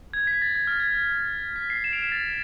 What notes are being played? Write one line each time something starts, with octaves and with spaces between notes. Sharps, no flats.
G#6
B6
A6
G#6
F6
G#6
G#6
B6
C7
C7 E7
D7 F7
C7 E7
A6